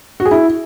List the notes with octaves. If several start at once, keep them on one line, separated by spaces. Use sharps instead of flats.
F#4
G#4
E4